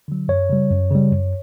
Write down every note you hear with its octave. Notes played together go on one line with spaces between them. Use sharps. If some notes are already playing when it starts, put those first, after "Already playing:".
D3 F#3
F#2 C#5
C#3 G3
F#2
C#3 G3
F#2